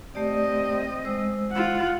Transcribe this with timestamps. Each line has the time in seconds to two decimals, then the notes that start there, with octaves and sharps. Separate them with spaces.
0.15 A3 C4 G4 D5 D#5
1.05 G#3 C5 E6
1.52 F4 F#5